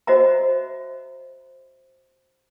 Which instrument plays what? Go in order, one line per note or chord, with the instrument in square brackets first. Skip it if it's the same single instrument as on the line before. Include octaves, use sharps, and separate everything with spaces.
[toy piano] F#4 C5 D#5 E5 A#5